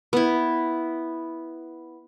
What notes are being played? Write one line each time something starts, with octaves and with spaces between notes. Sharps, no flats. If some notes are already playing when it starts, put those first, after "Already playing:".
B3 E4